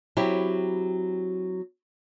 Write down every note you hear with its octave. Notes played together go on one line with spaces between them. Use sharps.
F#3 C4 E4 G4